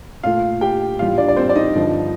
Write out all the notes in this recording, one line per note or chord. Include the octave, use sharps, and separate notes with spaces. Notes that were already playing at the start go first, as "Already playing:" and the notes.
A#2 A3 F4 F5
G4 G5
A2 G3 F4 F5
D4 D5
D5
C4 C5
D5
D#4 D#5
G2 D3 F3